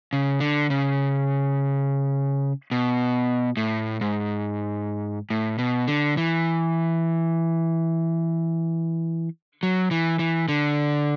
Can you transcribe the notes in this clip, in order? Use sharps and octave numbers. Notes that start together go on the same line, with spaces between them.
C#3
D3
C#3
B2
A2
G#2
A2
B2
D3
E3
F#3
E3
E3
D3